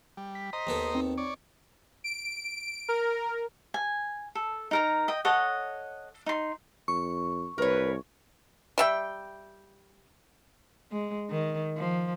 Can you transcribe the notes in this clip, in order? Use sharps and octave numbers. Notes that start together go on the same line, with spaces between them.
G3
B6
C5 D#5 A#5
D#2 B3 A4
C4 D#4
C#5 D5
D7
A#4
G#5
A4
D#4 A#4 A#5
D#5 G5
A4 C#5 D#5 F#5
D#4 C6
F2 C#6
C2 A#4 B4 C#5
G3 E5 G5
G#3
D#3
F3